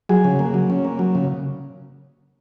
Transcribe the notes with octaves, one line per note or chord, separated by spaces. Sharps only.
F#3 G#4
C#3
A#3
F#3
C#4
A#3
F#3
C#3